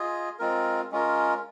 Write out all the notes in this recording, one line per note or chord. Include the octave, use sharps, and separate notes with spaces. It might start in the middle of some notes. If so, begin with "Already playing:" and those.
Already playing: F4 G#4 D#5
G#3 C4 F4 A#4
G#3 C#4 F4 A#4